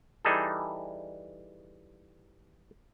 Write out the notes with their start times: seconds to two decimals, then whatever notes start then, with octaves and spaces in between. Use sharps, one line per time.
0.25 E3 G3 D#4 G#4 A4